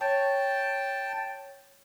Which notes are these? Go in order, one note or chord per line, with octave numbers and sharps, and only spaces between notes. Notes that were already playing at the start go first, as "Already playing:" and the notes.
C#5 G5 A5